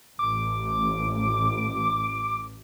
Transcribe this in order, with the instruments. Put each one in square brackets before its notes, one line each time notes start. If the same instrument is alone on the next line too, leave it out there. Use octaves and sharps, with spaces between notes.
[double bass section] A1 [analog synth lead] D6